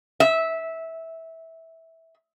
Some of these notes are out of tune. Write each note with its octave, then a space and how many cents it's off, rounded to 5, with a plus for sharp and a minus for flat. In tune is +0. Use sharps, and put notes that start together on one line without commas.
E5 -15